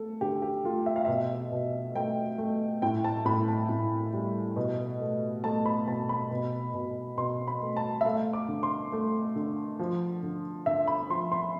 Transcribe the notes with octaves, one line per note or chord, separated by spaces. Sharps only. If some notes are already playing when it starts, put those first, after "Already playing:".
Already playing: A3 A4
D3 G4
G4
A3 F4
E5
F5
B2 E5
B2
A3 G5
A3
A2 G5
A5
A2 B5
A5
A2
G3
B2
A3
A3 A5
B5
B2 A5
B5
B2
B2
B2 C6
B5
A3
A5
E5
A3 F5
D6
D3
C6
A3
D3
F3
D3
D3 E5
B5
F3 C6
C6